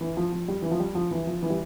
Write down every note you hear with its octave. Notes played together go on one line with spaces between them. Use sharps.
E3
F3
F3
G3
E3
F3
G3
F3
E3
F3
E3
G3